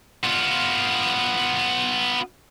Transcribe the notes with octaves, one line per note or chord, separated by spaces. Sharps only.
B3 F4